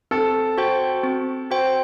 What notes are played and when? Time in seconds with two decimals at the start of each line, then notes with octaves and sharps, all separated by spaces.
0.11 C4 A4
0.58 F#4 C5 G5
1.03 C4
1.51 F#4 C5 G5